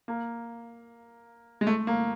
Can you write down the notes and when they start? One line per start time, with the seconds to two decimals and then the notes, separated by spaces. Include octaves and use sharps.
0.08 A#3
1.61 G#3
1.67 A3
1.87 A#3